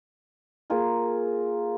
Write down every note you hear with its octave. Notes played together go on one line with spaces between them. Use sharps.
A#3 F4 G#4 A#4